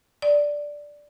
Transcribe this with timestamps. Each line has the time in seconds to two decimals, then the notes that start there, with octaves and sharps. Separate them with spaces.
0.22 D5